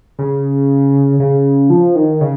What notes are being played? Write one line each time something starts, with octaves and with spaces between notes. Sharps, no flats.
C#3
C#3
F3
D#3
C#3